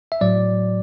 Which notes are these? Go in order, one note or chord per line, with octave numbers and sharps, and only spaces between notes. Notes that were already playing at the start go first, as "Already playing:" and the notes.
E5
A2 F#3 D5